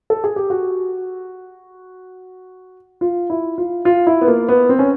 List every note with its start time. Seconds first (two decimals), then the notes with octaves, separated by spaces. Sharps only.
0.10 A4
0.24 G#4
0.36 G4
0.50 F#4
3.01 F4
3.30 E4
3.58 F4
3.85 F4
4.07 E4
4.21 B3
4.27 A#3
4.49 B3
4.69 C4
4.79 C#4